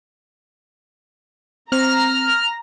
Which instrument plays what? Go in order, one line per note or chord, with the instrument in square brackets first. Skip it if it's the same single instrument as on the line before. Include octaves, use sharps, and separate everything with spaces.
[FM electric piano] C4 [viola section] A#5 [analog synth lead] F6